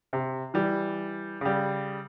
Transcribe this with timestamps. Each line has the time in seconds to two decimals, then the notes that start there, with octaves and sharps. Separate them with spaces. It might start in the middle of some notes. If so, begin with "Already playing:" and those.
0.13 C3
0.54 E3 G3
1.41 C#3 G3